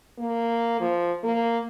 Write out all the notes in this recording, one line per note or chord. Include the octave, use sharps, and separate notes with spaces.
A#3
F3
A#3